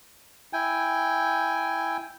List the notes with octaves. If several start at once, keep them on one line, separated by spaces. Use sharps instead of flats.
E4 G5 G#5